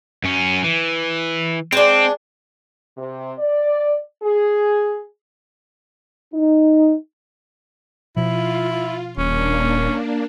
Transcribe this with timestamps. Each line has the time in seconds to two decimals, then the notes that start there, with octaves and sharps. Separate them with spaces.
0.24 F#2 C#4
0.64 E3
1.72 G#3 C4 D4
2.97 C3
3.38 D5
4.22 G#4
6.33 D#4
8.17 B2 F3 E4 F4
9.17 D#1 A#3 C#4 D4